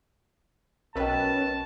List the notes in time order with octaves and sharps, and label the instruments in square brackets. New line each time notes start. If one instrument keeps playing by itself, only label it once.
[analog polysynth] B1 B4 [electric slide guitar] C#4 [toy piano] A#4 D#5 G5 [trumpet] A5